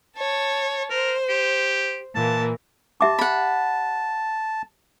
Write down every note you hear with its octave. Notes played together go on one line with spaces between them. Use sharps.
C#5 A5
A#4 C5
G4
A#2 E3 A#3 A5
G4 E5 A5 D6
F#5 B5